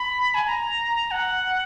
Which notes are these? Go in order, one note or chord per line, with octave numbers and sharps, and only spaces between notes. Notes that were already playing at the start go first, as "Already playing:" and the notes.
Already playing: B5
G#5
A#5
F#5